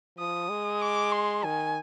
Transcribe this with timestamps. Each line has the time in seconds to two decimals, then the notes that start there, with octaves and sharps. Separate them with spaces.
0.18 F3 D#6
0.50 G#3
0.82 D6
1.12 C6
1.44 D#3 G#5